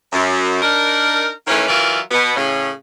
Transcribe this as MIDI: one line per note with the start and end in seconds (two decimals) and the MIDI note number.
0.12 0.60 42
0.62 1.30 62
0.62 1.30 63
0.62 1.30 70
1.47 1.67 51
1.47 1.67 52
1.47 1.67 57
1.47 1.67 58
1.47 1.67 61
1.68 1.99 52
1.68 1.99 54
1.68 1.99 65
1.68 1.99 70
1.68 1.99 74
1.68 1.99 76
2.11 2.33 47
2.11 2.33 59
2.36 2.71 45
2.36 2.71 49
2.36 2.71 61